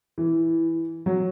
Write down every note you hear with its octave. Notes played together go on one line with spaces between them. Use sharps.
E3
F#3